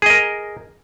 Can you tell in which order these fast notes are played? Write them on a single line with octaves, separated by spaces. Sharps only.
G#4 D#5 A#4